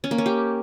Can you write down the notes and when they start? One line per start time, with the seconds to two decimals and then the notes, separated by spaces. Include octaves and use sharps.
0.04 C#4
0.11 A#3
0.18 C#4
0.26 G4